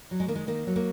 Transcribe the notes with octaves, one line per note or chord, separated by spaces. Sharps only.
F#3
G#3
D#3 A#3
G#3
D#3 A#3
F#3
A#3